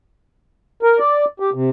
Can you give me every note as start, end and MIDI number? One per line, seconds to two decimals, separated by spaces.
0.83 0.99 70
0.99 1.25 74
1.40 1.50 67
1.54 1.70 48